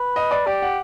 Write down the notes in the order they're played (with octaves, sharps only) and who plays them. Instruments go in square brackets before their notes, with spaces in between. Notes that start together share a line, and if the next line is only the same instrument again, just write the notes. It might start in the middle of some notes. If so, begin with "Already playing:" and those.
Already playing: [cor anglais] B4
[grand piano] D#5
D5
[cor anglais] G4 [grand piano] D5
[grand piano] F#5